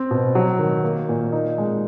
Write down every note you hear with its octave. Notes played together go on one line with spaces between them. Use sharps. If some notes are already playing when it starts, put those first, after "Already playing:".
Already playing: C4
B2
F#3
D#3
A#3
A#2
D#4
G#3